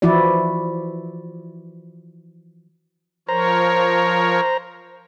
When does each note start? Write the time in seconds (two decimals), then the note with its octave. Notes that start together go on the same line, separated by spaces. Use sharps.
0.02 E3 F3 E4 F#4 D5
3.29 F3 A#4 C5 C#5 A#5